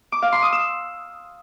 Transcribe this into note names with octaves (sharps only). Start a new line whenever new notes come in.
D6
F5
C6
D#6
E6